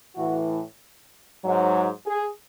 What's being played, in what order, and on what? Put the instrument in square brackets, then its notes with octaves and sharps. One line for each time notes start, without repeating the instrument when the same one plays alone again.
[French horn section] A2 E3 F#4
G#2 F#3
G#4